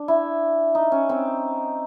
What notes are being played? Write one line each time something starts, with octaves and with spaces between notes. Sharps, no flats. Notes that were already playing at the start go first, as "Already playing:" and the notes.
Already playing: D4
E4
D#4
C#4
C4